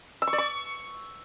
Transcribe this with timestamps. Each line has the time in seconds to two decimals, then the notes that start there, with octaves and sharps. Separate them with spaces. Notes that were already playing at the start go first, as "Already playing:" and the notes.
0.22 E6
0.27 C#6
0.33 D5
0.38 C#6